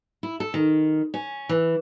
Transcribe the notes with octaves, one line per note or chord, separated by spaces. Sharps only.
E4
A4
D#3
C#4
E3